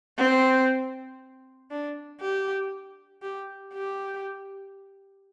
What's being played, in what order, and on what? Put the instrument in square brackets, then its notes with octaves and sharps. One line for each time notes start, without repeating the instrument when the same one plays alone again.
[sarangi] C4
D4
G4
G4
G4